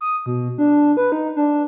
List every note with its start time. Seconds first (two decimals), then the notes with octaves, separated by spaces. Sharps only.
0.01 D#6
0.26 B2
0.58 D4
0.97 B4
1.12 D#4
1.37 D4